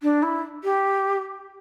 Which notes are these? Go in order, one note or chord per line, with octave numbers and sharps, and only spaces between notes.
D4
E4
G4